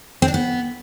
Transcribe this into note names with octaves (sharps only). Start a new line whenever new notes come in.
C4
D4
B3